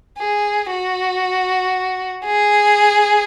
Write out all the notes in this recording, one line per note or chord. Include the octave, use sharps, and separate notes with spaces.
G#4
F#4
G#4